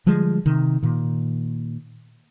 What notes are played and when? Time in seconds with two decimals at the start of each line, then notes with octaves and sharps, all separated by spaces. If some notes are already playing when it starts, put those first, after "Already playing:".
0.06 D3 F3 G3 G#3
0.46 C3 D#3
0.83 A#2 D#3